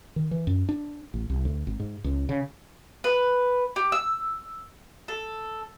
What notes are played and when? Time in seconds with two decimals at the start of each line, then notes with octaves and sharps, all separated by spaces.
0.16 D#3
0.31 E3
0.47 F#2
0.69 D4
1.14 A1
1.30 C2
1.45 D2
1.67 G#1
1.80 G#2
2.04 C#2
2.29 C#3
3.04 B4
3.76 G4
3.92 E6
5.08 A4